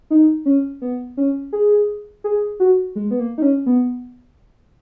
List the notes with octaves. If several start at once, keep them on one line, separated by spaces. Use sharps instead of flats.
D#4
C#4
B3
C#4
G#4
G#4
F#4
G#3
B3
A#3
D#4
C#4
B3